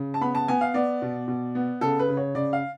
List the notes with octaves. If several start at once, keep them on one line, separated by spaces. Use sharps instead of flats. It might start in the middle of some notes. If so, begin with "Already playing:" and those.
Already playing: C#3
A5
B3 B5
A5
B3 G#5
F5
B3 D5
B2
B2
B3
C#3 A4
B4
C#3
C#5
C#3 D5
F5